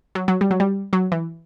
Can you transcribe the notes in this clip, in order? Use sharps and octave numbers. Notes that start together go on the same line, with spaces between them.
F#3
F#3
G3
F#3
G3
F#3
E3